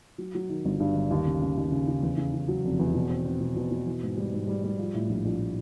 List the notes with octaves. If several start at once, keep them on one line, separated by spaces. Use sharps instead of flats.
F#3
F#3
D#3
G1
G2
G1
D#2
C#3
C#3
D#2
C#3
C#3
E2
C#3
C#3
F#3
F1
E2
B2
C4
C4
B2
B2
B2
E3
G#2
G3
G#2
G3
G3
F3
A2
A#1
A#1